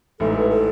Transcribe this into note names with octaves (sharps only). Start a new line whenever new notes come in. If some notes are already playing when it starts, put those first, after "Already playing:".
A1 G#2 E3 A3 A4
B4
A4